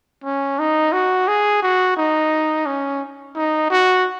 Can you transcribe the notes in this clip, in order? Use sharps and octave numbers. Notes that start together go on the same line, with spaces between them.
C#4
D#4
F#4
G#4
F#4
D#4
C#4
D#4
F#4